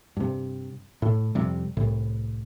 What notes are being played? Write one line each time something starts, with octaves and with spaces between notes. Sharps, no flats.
G2 C3
A2
F2 C3 G3
C2 A2